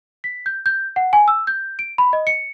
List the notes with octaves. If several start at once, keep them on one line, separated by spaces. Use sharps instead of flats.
B6
G6
G6
F#5
G#5
E6
G6
D7
B5
D#5
C#7